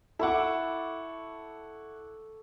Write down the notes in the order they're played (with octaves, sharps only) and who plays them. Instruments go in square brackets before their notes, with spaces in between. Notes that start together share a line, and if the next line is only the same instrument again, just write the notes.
[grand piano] E4 F#5 [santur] A4 C#6 D6